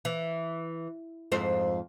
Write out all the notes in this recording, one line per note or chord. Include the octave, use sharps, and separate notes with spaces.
E3
F2 G#2 C5